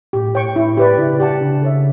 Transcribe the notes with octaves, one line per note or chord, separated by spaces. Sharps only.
A2 G4
C#5 G5 C#6
E4
G4 B4 D5
C#3 E4
G4 D5 F#5 A5
C#3 D4
A4 C#5 E5